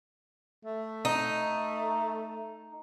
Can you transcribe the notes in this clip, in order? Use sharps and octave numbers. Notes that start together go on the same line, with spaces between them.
A3
D#4